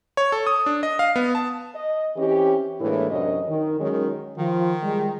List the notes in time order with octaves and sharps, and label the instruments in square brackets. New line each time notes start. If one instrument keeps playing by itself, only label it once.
[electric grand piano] C#5
A4
D#6
D4
D#5
F5
B3
A5
[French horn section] D#5
E3 C4 C#4 E4 G4
A2 E3 G#3 A#3 D4 E4
F#2 C3 F#3 D4 D#5
D#3
D#3 F#3 G#3 C#4
[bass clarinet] D#3 [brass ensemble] F3 F4
[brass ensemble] G3 G#3